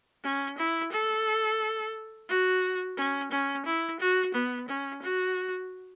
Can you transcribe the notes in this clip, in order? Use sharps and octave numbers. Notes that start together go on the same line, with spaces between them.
C#4
E4
A4
F#4
C#4
C#4
E4
F#4
B3
C#4
F#4